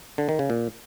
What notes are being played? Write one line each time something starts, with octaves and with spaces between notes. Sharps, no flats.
D3
D#3
C#3
A#2